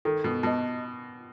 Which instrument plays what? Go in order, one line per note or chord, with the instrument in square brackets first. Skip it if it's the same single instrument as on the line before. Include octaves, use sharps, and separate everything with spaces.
[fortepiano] D#3 [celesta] A4
[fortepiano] B2
[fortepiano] B2 [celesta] D#5 A5